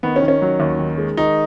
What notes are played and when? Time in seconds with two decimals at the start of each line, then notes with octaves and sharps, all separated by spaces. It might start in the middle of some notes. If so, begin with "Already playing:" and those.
0.03 D#3 B3
0.16 C#4
0.22 D#3
0.28 C#4
0.42 F#3
0.60 D#2
0.79 D#3
0.98 G#3
1.17 D#3 D#4